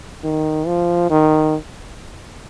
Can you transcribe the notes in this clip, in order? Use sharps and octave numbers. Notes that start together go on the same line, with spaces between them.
D#3
F3
D#3